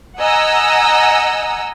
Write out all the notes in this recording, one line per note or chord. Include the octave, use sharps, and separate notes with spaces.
D#5 F#5 G#5 A#5 E6